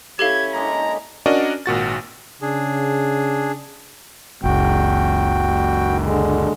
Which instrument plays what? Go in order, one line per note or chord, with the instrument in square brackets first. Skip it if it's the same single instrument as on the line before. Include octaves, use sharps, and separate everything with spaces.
[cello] C#4 E4 [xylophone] G4 A4 F5 [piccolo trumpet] G#6
[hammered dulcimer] D3 G#3 A#3 [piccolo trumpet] A#5
[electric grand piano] C#4 D4 F#4 A#4 D5 D#5
G#1 A#2 F#4 A6
[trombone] C#3 [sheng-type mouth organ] D4 G#4
[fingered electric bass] F#1 C#2 [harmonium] F#4 G5
[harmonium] D3 G#3